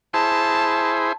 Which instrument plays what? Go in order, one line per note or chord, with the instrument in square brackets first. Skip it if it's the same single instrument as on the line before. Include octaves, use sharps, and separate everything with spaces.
[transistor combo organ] E4 G#4 C5 [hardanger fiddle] A5